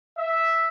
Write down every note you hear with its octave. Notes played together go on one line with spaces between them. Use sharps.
E5